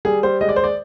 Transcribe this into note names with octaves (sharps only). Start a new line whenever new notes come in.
G3 G#4
G3 C5
G#3 D#5
D5
C5
D5